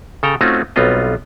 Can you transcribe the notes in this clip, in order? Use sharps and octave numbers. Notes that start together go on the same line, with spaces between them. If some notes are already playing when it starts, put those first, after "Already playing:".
C#3 A4 G5 A#5
A3 C4 C#4 D#4 F4 F#4
B1 G3 B3 C4 F4 D#5